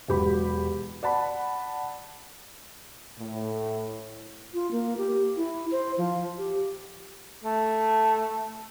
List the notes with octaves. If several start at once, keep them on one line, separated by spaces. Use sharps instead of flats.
E1 F#3 G4 B5
D5 F#5 A5 B5
A2
F4
A#3
G4
E4
C5
F3
G4
A3